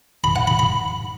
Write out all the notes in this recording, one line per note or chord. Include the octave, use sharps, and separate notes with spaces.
B5
F#5
B5
B5